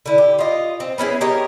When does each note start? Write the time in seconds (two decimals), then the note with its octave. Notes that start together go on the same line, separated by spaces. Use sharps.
0.06 D3 E4
0.18 G4
0.39 F4 D#5
0.80 C4
0.98 B3 C#4 E4 G#4
1.21 G4 A#4 C#5 D#5